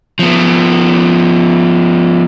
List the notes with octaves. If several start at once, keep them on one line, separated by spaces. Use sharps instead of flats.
F3 B3